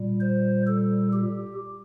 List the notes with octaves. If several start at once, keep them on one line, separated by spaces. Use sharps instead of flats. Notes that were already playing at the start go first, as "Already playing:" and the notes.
Already playing: A#2 G3
C5
A4
G4